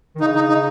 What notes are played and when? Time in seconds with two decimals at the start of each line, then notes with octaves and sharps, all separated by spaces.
0.15 D#3
0.21 C#3 D#4
0.35 D#4
0.49 D#4